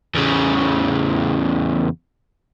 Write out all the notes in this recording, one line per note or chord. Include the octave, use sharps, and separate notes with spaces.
E2 C#3